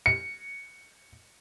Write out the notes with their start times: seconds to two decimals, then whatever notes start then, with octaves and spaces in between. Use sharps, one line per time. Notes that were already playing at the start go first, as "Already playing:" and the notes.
0.06 C#7